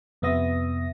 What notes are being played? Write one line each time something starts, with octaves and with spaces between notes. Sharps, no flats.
F2 C3 B3 E5 D#6 A#6